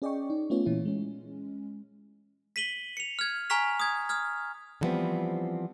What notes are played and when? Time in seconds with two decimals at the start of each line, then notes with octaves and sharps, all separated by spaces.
0.02 C#4 G#4 D5 D#5 G5 C#6
0.30 D#4
0.50 A3 B3 C#4 F4 C#5
0.65 A#2 E3 C#4 E4
0.85 G#3 C#4
2.56 B6 D#7 F#7 G7
2.97 C#7 F7
3.19 F6 G#6
3.50 G#5 A#5 C#6 F6 B6 F7
3.80 D#6 G#6
4.09 D#6 F6 G#6
4.81 D3 E3 F3 G3 B3 C4